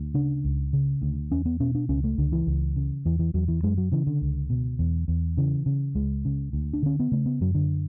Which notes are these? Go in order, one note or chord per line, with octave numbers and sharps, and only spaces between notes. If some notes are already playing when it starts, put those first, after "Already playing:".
Already playing: D2
C#3 D4
C#2
C#3
D2
E2 C#4
B3
B2 C#4
D4
C#2 C#4
A3
C#2 D3
E3
C#2
C#3
E2 E3
E3
E2 F#3
E3
F#2 G#3
F#3
C#3 E3
D3
C#2
B2
E2
E2
C#3 E3
C#3
C#2 G#3
C#3
D2
D4
D3 C#4
B3
C#3 A3
B3
F#2 F#3
D3